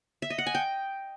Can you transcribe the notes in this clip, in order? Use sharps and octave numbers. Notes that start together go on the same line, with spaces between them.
E5
D#5
F#5
G#5
G5